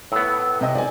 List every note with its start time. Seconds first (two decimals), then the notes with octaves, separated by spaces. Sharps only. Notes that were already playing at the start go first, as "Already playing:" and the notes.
0.12 A2 B3 E6
0.61 C3 D#5 G5
0.75 G#1 D5 G#5